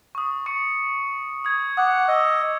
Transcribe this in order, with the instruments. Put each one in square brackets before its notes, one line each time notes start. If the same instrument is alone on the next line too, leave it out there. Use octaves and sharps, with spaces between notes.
[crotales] C#6 D#6
C#6 C#7
D#6 G#6
[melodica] F#5 [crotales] D6 D#6
[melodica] D#5 [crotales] E6